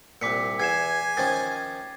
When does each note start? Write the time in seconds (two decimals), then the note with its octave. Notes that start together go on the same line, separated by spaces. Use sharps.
0.22 C2 A#2 D6 B6 C#7
0.60 E2 G#5 G#6 C7 E7
1.17 D#3 F3 C#4 A6